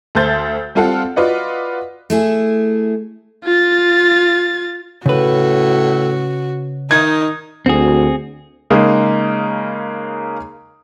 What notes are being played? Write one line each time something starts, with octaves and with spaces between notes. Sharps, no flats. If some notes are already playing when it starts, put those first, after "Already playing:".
D2 A3 A4 C5 G6 A6
G3 C4 F4 A4 F5 F#5
F4 F#4 B4 D5 D#5 F#5
A3 E4 G#4
F4 A6
A2 C#3 F#4 B4
D#3 D#4 G#6
D2 C4 F#4 G#4
C#3 G#3 A#3 D#4